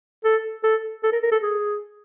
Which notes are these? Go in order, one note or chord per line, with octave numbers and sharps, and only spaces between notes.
A4
A4
A4
A#4
A#4
A4
G#4